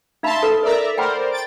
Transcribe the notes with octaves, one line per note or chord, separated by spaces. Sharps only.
D#4 E5 F5 A5 B5 C6
A4 B4
A#4 B4 D5 E5 A#5
A#4 C5 D5 F#5 G5 B5
G5 A6 D7